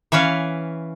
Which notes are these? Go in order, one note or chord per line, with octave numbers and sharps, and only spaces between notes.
E3 C#4 B4 C#5 F5